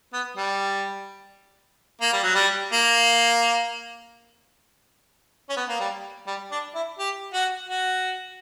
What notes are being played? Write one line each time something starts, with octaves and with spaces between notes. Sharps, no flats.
B3
G3
A#3
G3
F#3
G3
A#3
C#4
B3
A#3
G3
G3
D4
E4
G4
F#4
F#4